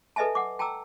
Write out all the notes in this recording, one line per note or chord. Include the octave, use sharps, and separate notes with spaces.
A4 B4 D#5 E5 G#5 A5
F#5 D6
G5 A5 A#5 D6 E6